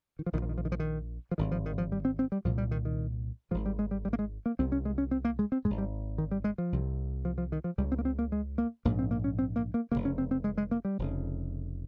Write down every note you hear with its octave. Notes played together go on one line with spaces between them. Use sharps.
D#3
F3
A#1 A#2 D#3
F3
D#3
F3
D#3
F3
D#3
F3
G#1 G2 D#3
F3
D#3
F3
G3
C4
C4
G3
C2 A#2 F3
G3
D#3
D#3
G#1 G#2 F3
G3
G#3
G3
G3
A#3
G#3
A#3
C2 C3 C4
C#4
G#3
C#4
C4
A#3
G#3
C4
G#2 G#3
G#1
G3
D#3
G3
G#3
F3
C2 C3
F3
F3
D#3
F3
C#2 C#3 G3
C4
A#3
C4
A#3
G#3
A#3
A#1 G#2 A#3
C4
A#3
C#4
C4
A#3
A#3
F1 D#2 C#3 A#3
C#4
C4
C4
G#3
G#3
A#3
G3
F1 F2 C#3